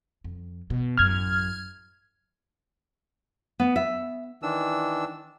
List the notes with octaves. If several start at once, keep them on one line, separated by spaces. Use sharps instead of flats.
F2
B2
A1 F#2 F6 G#6
B3
E5
D#3 E3 D4 E6